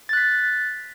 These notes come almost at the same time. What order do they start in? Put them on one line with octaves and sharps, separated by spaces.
A6 F#6 B6